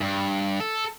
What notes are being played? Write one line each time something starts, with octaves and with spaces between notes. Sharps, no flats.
G2
A4